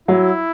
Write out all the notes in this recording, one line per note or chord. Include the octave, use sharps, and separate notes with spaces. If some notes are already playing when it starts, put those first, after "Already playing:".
F#3 E4